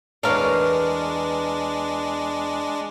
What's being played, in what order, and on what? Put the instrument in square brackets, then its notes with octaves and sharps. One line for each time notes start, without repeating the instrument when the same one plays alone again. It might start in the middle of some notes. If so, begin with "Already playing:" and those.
[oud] E2 B4 C#5 [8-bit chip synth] G#3 D4 [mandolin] A#4 F5